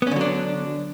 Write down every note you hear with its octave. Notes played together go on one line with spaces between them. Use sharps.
D3 F#3 B3 C#4 D4